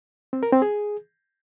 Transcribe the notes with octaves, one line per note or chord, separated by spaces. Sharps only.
C4
A#4
C4
G#4